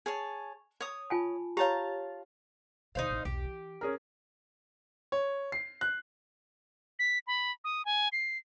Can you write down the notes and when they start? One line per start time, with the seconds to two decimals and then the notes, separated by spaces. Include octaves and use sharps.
0.06 G#4 C#5 A5
0.80 C#5 D#6
1.10 F4 G#5 A5
1.57 F4 G4 C#5 A5 A#5
2.95 D#2 B2 D#4 C5 F5
3.10 D1 A1
3.25 B1 E2 G4
3.44 E3
3.81 C#4 G#4 A#4
5.12 C#5
5.52 C7
5.81 F#6
6.99 B6
7.27 B5
7.64 D#6
7.85 G#5
8.12 C7